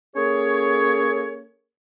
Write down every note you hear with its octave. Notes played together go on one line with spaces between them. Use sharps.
A#3 C#4 G#4 A4 C#5